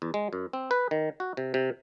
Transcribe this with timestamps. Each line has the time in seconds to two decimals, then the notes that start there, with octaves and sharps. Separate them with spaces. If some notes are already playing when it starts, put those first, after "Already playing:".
0.02 E2
0.14 G#3
0.33 F#2
0.53 C4
0.71 B4
0.91 D#3
1.20 F#4
1.37 C3
1.54 C3